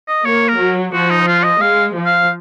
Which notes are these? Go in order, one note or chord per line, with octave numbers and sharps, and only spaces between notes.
D#5
A#3 C#5
A#4
F#3
F3 F#4
D#4
F4
D#5
G#3 F5
F3
F5